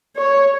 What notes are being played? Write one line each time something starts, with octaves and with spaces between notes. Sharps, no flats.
C#5